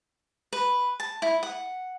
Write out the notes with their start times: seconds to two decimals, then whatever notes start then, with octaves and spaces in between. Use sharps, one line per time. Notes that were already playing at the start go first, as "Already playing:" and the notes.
0.53 B4
1.00 A5
1.22 E4
1.43 F#5